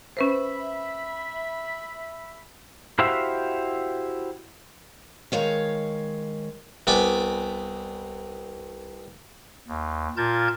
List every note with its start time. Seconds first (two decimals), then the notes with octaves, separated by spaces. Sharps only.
0.17 C#4 B4 C5 E5 B5
2.99 E4 F#4 G4 C5 E5 F5
5.32 D#3 G#3 C#5 F5
6.87 C2 B3 D5 G#5 B5 D6
9.68 D#2
10.17 A#2 F4 A#4 A5 G6 G#6